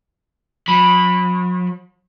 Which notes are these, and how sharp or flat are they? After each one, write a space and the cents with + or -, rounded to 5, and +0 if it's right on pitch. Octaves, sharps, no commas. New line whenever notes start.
F#3 -45 B5 +0